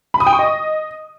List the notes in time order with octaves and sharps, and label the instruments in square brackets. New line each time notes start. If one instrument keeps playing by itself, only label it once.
[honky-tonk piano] B5
D#6
G5
C#6
D#5